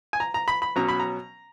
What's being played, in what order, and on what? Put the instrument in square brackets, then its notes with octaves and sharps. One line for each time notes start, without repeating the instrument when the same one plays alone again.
[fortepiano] G#5
A#5
A#5
B5
B5
B2 F#3 C#4 A#5
B5
A#5